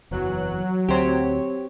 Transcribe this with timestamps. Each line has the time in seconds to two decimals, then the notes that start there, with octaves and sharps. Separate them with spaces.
0.11 F#1 E2 E3 F#3 F#6
0.89 D2 C4 G4 C5 C#5